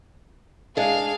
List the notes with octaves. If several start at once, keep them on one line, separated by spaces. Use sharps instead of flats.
G#3 D4 G#4 F5